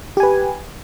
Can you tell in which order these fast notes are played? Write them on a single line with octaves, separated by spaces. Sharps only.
G4 G#5 B4